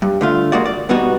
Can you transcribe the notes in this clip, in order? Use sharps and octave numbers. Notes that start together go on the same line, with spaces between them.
G2
D3 A3 F4
G#3 A#3 F#4 D5
D5
G#2 B2 G3 B3 D#4 F#4